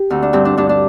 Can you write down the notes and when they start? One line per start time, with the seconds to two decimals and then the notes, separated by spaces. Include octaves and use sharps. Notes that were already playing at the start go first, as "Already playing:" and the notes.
Already playing: G4
0.10 D2 C4
0.22 D4
0.33 G2 C4
0.45 D4
0.57 G2 D4
0.69 D4